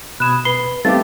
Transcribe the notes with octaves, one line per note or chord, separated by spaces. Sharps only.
B2 B5 D#6 F#6 G#6 E7
B4 B5 C7 G7
G3 A3 B3 C4 D#4 G4 F5 A6